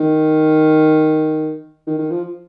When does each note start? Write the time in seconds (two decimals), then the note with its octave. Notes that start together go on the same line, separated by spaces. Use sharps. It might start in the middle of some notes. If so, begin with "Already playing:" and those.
Already playing: D#3
1.87 D#3
1.99 D#3
2.11 F3